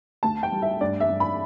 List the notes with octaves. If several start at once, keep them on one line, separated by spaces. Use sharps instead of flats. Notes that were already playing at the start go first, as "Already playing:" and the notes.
D2 A5
G5
G3
E5
G2 D5
E5
G2
B5